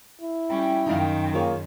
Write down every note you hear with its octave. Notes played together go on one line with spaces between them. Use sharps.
E4
G3 C#4 G5 B5
F#2 D#3 D#4 F5
A#3 F4 G#4 C#5